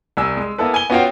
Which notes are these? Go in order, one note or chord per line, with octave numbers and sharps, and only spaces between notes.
C2 G3 G#5 E6
G#3
A#3 B3 E4 A4 B4
G#5 G7
B3 C#4 F4 F#4 F5 G5